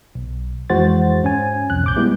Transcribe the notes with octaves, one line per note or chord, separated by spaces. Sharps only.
B1
F2 E3 G#3 F#4 C5 A6
G#2 C#4 G#5
C2 F2 F#6
A#1 D6 G6
G3 G#3 B3 E4